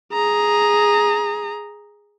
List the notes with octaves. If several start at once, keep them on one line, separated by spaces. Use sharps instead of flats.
G#4 A#5